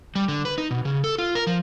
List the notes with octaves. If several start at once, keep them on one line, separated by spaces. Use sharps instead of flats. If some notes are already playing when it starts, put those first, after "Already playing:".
G3
D3
B4
D#4
B2
C#3
A4
F4
A#4
F3